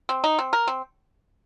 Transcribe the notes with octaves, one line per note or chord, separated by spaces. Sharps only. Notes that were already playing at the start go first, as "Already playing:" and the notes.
C4
D#4
C4
A#4
C4